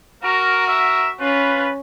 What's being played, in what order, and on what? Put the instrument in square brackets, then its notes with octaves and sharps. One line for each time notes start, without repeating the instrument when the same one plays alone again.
[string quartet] F#4 [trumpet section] A#4
[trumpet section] A#4 E5
[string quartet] C#4 [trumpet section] F4 B4